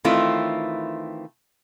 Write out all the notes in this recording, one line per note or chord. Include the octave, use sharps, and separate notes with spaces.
D#3 E3 A3 C4 E4 F4